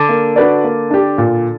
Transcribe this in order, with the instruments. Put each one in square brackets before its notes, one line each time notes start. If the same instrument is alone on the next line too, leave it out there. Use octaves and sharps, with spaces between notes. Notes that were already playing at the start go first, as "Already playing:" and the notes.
Already playing: [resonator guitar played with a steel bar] D3
[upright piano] A#3
D4 F#4 B4 D5
A#3
D4 G4
A#2